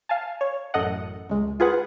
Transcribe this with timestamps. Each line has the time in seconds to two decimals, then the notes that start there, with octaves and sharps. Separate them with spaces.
0.09 F5 G#5 A5
0.41 C#5
0.74 A1 F#2 A4 D#5 F#5
1.29 C#2 G#3
1.60 F4 G#4 B4 F#5